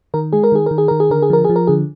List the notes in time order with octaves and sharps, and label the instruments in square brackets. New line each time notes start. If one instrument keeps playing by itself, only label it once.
[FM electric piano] D#3 A#4
G#3 G#4
A#4
D#3 G#4
D#3 A#4
G#4
D#3 A#4
G#4
D3 A#4
G#4
F3 A#4
G#4
F3
A#4
D3 G#4